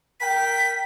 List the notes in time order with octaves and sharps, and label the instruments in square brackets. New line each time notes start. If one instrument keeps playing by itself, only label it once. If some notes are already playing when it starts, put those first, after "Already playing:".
[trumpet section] A#4 G5 [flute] B6